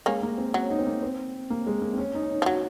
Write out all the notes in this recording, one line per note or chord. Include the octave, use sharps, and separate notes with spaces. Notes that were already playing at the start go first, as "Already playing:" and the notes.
G#3 A#3 C#4
A#3
C4
F#3 C#4
D#4
C4
A#3
C4
A#3
G#3
A#3
C4
C#4
D#4
C#4
D#4
F3
F#3 F#4